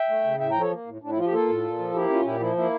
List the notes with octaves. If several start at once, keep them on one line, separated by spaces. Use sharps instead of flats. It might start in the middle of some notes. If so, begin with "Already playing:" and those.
Already playing: E5 G5
A3
C#3
A2 E5 G5
F3 G5 A#5
A4 C#5
A#3
A2
A2 D4
E4
F3 F4
G4
A#3 F4 A4
A2
A#2
F3
A#3 E4 G4
C#4 F4
A#2 E4 G4
F3 E4
A#3 E4